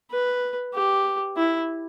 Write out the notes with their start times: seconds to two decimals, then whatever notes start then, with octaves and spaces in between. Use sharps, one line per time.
0.11 B4
0.74 G4
1.36 E4